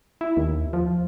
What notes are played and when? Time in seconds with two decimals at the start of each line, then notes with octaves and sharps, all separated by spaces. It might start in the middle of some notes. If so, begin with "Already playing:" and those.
0.21 E4
0.37 D#2
0.73 F3